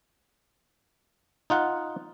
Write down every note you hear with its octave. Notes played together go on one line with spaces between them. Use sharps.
D#4 F4 F#5